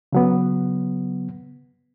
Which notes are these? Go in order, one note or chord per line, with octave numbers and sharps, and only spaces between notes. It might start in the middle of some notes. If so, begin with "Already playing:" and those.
C#3 F#3 B3